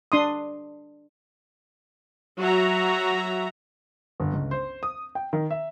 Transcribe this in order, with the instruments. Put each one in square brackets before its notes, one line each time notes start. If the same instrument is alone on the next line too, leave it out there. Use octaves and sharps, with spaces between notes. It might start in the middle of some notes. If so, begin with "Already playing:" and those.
[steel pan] D4 C6 D#6
[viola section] F#3 F#4 E5 A#5
[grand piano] G1
C#2
C5
D#6
G5
D#3
E5